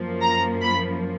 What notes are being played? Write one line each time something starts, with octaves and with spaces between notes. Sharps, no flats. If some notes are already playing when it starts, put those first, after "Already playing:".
Already playing: F#2 F3 A#3
A#5
B5